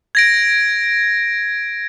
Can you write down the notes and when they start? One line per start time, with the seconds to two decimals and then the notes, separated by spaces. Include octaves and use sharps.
0.15 G#6 A#6 D7